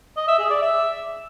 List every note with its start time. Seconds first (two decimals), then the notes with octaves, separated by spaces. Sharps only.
0.17 D#5
0.28 E5
0.39 G#4
0.50 D5
0.61 E5